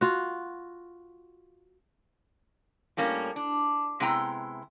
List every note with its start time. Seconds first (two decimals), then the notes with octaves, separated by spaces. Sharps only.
0.01 F4 F#4
2.97 A2 G3 A#3 C#4
3.36 D4
4.00 C3 G#3 B3 E4 G5 A#5